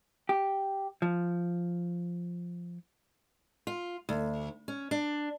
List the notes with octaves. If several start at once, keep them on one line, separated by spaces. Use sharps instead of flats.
G4
F3
F4
D2
C#4
D4